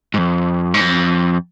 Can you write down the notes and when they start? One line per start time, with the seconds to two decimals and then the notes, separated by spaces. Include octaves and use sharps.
0.14 G#2
0.18 F2
0.74 G#2
0.81 F2